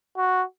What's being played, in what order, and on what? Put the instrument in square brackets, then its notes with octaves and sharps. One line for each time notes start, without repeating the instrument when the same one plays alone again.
[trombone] F#4